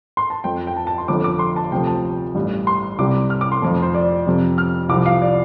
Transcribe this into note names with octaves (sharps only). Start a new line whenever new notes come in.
C6
A5
F2 F3 G5
G5
A5
A5
C6
G1 F2 D3 F3 D6
D6
C6
A5
D2 C3 F3 G5
A5
A1 G2 G3
C6
C2 C3 G3 D6
F6
D6
C6
F1 F2 F3 A5
C5
D5
F2 C3 F3
F6
C2 C3 F3 D6
F5
D5